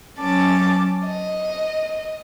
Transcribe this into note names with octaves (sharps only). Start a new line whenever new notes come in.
F#3 C#4 A5 D6
D#5